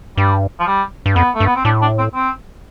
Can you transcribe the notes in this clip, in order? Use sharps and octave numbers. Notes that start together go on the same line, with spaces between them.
G2 G3
F3
G3
G2
F2 B3
A3
G2
B3
C4
A2 D4
D4
C4
C4